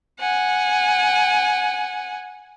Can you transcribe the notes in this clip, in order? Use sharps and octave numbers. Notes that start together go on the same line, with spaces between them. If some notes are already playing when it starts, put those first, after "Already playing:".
F#5 G#5